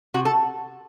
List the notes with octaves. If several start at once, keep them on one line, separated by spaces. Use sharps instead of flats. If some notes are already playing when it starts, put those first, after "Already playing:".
C3 F#4
A4